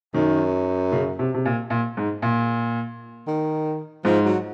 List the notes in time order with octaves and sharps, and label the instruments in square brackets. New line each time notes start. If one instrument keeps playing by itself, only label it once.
[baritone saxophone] F#2 [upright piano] D#3
[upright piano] C#3
C3
C3
A#2
A#2
G#2
A#2
[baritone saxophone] D#3
[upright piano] G#2 [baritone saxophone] F3
[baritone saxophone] F#3